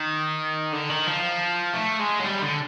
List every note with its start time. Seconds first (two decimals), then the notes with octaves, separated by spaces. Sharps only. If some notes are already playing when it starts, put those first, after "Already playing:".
Already playing: D#3
0.73 D3
0.89 D#3
1.06 F3
1.74 A3
2.00 G#3
2.20 F#3
2.25 G3
2.42 D3